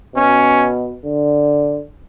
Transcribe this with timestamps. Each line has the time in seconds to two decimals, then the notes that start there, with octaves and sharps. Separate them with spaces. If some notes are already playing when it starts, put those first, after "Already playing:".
0.15 B2 C#4
1.05 D3